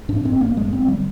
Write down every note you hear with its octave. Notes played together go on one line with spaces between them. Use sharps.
G#2 D4
G#2 C4
G#1 A#3
G2 G#3
G1 C4
D3 G3